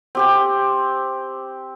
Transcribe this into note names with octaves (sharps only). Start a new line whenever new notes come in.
C4 G4 C5